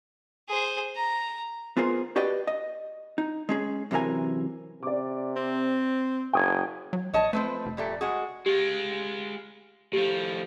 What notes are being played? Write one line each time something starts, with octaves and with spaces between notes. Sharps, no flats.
G#4 C5
A#5
B3 F4 G#4 A#4 C5
F#4 G4 B4 D5 D#5 G5
D#5
D#4
G#3 C#4 G#4
F#2 C3 E3 A#4 G#5
C3 D5 D6
C4
F#1 G5 D#6 G#6
F#3
A#1 C#5 D#5 A5
F3 A3 C4 B4
F1
A#2 G3 A3
G#3 F#4 G#4
G#3 F4 G4
A2 F3 G4